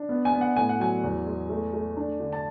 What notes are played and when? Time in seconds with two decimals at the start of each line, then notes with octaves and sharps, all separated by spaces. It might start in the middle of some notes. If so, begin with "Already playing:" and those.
Already playing: D4
0.09 B3
0.25 G#5
0.33 B3
0.41 F#5
0.56 A2 G#5
0.69 F#5
0.80 F#3 G#5
1.04 E2
1.27 G#3
1.49 A3
1.74 A3
1.97 D4
2.20 D3
2.32 A5